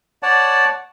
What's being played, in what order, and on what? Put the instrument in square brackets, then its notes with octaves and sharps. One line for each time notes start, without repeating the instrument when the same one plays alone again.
[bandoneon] C#5 D5 F#5 A5